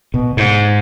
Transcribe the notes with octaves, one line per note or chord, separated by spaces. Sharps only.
B2
G#2